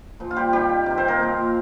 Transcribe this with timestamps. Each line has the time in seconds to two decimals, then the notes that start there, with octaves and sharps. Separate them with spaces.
0.20 A#2 F3
0.31 F4
0.36 G3 G4
0.53 C3 D#3 G3 G4
0.86 C3 D#3
0.97 C4 C5
1.08 A#3 A#4
1.20 A#2 F3